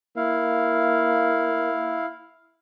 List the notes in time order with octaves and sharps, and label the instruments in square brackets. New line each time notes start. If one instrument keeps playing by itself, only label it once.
[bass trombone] A#3 [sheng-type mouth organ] E4 F5